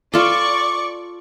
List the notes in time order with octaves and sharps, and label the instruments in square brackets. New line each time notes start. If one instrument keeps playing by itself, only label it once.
[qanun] F4 A4 [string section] D5 C#6 [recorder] D6